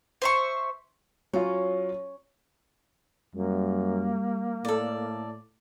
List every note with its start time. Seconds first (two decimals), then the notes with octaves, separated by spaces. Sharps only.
0.22 C5 E5 C#6
1.33 F#3 C#4 F4
3.35 F#2 G3 A#3
4.65 A2 A4 D5